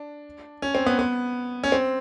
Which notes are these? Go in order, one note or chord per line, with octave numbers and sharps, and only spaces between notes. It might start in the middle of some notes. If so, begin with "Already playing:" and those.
Already playing: D4
C#4
C4
B3
B3
C#4
C4